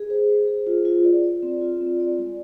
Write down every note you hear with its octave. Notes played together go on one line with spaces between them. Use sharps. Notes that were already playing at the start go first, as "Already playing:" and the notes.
Already playing: G#4
C5
C5
G#4
F4
F4
D5
D5
C4
F4
C4
D5
G#3